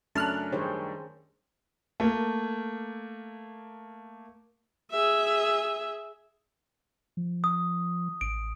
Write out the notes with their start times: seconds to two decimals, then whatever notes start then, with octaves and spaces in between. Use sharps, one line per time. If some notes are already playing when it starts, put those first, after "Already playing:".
0.15 F#2 A3 C#4 D4 A5 F6 F#6
0.52 D#3 G3 G#4 C5 C#5
2.00 A3 A#3
4.92 G#4 E5
7.17 F3
7.44 D#6
8.21 A1 D7